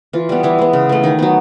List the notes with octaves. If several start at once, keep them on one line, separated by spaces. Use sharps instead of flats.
E3 F4
G3 B3
E3 E4
G#3 B3
C#3
E3 A3
D#3 D#4
F#3 B3